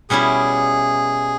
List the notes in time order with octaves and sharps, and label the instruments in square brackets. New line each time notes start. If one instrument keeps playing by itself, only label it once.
[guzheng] B2 G3 C#4 E4 [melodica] G#4